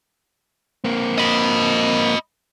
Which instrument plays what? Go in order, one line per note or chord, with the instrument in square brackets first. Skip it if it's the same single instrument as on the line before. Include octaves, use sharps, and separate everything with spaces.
[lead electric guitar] A#3 C4
[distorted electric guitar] D#5 B5